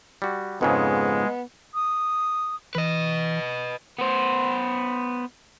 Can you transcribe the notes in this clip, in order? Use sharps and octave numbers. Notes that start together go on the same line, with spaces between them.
G3 F#4
F2 G#2 C#3 G#3 B3
D#6
E3 B4 D#5
B3 C5